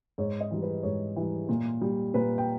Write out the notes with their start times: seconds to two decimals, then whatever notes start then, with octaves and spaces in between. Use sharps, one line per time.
0.18 G#2 C#5
0.41 D#5
0.51 E3 G3
0.62 B4
0.83 G#2 C#5
1.16 E3 G3
1.49 A#2
1.81 G3
2.14 A#2 B4
2.38 G5